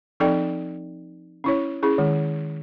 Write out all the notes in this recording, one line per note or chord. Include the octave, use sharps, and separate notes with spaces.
F3 C4 D#4 A4 D5 G5
C#4 E4 C#5
C#4 E4 G#4
D#3 G#3